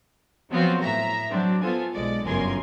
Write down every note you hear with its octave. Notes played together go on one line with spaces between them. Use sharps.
F3 F#3 B3 C4 F4 F#4
A2 E5 A#5
F#3 C4 D4
B3 F4 A4 C5 G#5
B1 G#3 D5
G1 F#2 C#3 A#4 G#5 C6